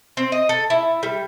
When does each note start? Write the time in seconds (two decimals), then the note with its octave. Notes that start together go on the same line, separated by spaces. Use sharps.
0.17 C4
0.32 D#5
0.49 A4
0.70 E4
1.03 G3